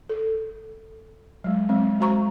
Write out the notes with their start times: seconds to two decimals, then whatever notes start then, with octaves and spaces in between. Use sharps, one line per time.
0.09 A4
1.44 F#3 G#3
1.69 E3 F#3 G#3 C4
2.00 G#3 F#4 C5 A#5 C#6